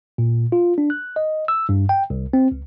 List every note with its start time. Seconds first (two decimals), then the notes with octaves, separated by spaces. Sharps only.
0.18 A#2
0.52 F4
0.78 D4
0.90 F#6
1.16 D#5
1.48 E6
1.69 G2
1.89 G5
2.10 C2
2.33 C4
2.51 C#2